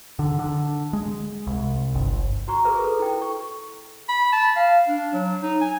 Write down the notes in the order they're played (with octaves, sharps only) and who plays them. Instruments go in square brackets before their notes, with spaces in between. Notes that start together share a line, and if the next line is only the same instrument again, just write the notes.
[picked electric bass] D3
D3
G#3
C2
G1
[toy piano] F#4 A#5 C#6
G#4 A#4 B4 E5
A4
E4 G5
C#6
[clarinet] B5
A5
F5
D4
F#3
D#4
G#5